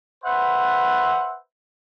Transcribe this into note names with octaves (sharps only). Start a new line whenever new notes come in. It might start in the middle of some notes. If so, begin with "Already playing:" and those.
B4 C5 E5 F#5